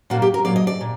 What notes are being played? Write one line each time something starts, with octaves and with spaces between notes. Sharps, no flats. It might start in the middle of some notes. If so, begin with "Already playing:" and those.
A#2 F#3 A#3 F#4
G4
A#4
A#2 F#3 A#3 D5
D#5
D5
A#2